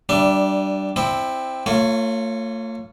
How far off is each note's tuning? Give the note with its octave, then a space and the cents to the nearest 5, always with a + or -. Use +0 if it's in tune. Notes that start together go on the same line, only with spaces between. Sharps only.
G3 -20 D4 +0 E5 +25
C4 +0 E4 +0 D5 +35
A3 +45 F4 +0 C#5 -5